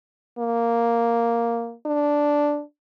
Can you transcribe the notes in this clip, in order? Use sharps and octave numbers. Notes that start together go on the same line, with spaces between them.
A#3
D4